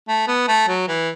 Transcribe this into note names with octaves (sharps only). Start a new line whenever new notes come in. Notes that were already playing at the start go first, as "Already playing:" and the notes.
A3
B3
A3
F#3
E3